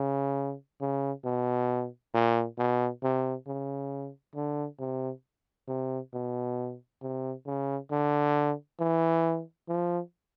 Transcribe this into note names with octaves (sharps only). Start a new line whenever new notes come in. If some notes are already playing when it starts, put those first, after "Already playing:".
Already playing: C#3
C#3
B2
A#2
B2
C3
C#3
D3
C3
C3
B2
C3
C#3
D3
E3
F3